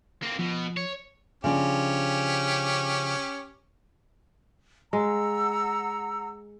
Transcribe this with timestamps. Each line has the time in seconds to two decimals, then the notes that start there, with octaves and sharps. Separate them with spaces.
0.22 A#3 C4
0.39 B2 F3
0.77 C#5
1.44 C#3 F3 C#4 D4 G4
4.93 G#3 F#5 A#5 E6